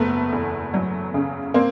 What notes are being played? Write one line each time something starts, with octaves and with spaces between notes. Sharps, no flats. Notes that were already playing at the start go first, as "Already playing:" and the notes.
Already playing: F#1 A3 B3
E2
F#3
C#3
A#3 C4